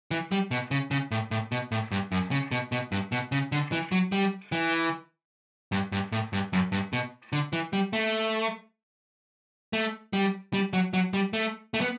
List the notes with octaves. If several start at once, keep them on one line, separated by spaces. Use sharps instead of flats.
E3
G3
B2
C#3
C#3
A2
A2
B2
A2
G2
F#2
C#3
B2
B2
G2
B2
C#3
D3
E3
F#3
G3
E3
G2
G2
A2
G2
F#2
G2
B2
D3
E3
G3
A3
A3
G3
G3
F#3
F#3
G3
A3
A3
B3